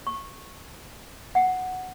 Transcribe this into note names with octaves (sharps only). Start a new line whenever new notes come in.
C#6
F#5